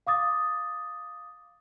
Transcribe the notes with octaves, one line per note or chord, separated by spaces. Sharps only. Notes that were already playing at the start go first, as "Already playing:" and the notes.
F5 D6 D#6 A6